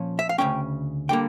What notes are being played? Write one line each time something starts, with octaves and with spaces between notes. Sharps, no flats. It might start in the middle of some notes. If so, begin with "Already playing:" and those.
Already playing: A#2 F3 C#4
E5
F5
D2 C#3 F3 A3 C#4 G5
D3 G3 A#3 G5